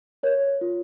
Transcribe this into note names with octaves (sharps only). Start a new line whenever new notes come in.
A#4 C#5
F4